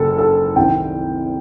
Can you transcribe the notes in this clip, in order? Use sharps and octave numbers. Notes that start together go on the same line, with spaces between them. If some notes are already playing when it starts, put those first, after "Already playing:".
Already playing: F#1 F#2 A4
A4
C2 C3 D#3 G5